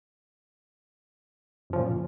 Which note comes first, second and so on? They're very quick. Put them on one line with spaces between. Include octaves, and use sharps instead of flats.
F#2 F3 C#3 A#2